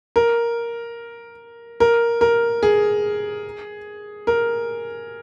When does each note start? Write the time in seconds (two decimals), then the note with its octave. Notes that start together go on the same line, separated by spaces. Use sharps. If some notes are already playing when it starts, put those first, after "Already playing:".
0.16 A#4
1.80 A#4
2.21 A#4
2.63 G#4
4.27 A#4